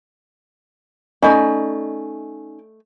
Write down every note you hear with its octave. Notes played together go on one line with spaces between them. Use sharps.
A3 C#4 D#4 D5 D#5 B5